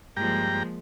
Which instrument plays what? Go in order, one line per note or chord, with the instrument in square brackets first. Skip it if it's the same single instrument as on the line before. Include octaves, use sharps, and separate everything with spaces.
[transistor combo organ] G2 G5 A#5 [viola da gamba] F3 G#3 A#3